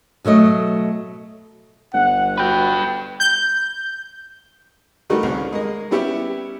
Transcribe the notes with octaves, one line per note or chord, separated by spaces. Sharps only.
B2 F#3 A3 D#5
G1 F#5
F#4 B4 G5
G6
D#3 G3 A3 D#4 F#4 B4
C2 C#3 C#4
G#3 A#3 D#5
G3 B3 C#4 E4 G4